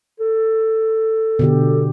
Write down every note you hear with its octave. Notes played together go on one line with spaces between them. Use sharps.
A4
B2 D3 G4